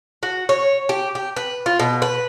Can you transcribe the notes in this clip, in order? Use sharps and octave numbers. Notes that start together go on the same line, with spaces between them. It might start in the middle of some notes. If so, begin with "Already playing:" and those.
F#4
C#5
G4
G4
B4
F4
B2
B4